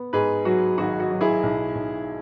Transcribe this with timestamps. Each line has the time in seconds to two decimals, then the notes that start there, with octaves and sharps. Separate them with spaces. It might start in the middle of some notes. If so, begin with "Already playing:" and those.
Already playing: B3
0.13 G#2 G#4 B4
0.45 F#3 F#4
0.78 G#1 F#4
1.00 F#4
1.11 F#3
1.21 E4 G#4
1.43 B1
1.75 B1